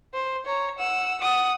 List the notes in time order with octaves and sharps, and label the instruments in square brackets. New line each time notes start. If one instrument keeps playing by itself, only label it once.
[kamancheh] C5
C#5 A#5
F#5 E6
F#5 D#6